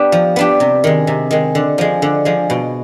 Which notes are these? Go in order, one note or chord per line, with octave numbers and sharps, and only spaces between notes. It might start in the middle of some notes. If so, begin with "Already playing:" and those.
Already playing: B3 D4 G4
F3
B3 D4 G4
C3
D#3 G#3
C3
D#3 G#3
D3
F3 G#3
D3
F3 G#3
B2